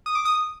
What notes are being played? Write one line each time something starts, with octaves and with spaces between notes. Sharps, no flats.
D#6
D6
D#6